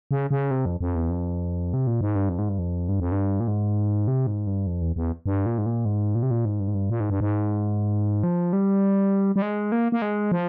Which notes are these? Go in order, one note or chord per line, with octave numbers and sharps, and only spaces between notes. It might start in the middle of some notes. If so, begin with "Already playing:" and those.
C#3
C#3
C3
F2
F2
E2
F2
C3
A#2
G#2
G2
F2
G#2
G2
F2
G2
F2
G2
A#2
G#2
C3
G#2
G2
F2
E2
E2
G2
A#2
G#2
A#2
G#2
A#2
C3
A#2
G#2
G2
G#2
G2
A#2
G#2
G2
G#2
F3
G3
G3
G#3
A#3
A#3
G#3
F3